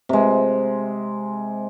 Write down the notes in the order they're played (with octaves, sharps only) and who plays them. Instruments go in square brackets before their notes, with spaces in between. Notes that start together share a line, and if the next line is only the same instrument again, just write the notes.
[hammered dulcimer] C3 G#3